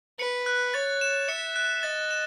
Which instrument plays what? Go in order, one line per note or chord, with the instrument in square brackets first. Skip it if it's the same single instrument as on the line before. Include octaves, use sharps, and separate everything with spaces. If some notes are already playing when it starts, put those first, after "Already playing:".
[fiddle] B4 [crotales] C#7
[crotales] F#6
[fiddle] C#5 [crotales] A6
[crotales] E7
[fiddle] E5 [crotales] C#7
[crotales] F#6
[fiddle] D#5 [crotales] A6
[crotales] E7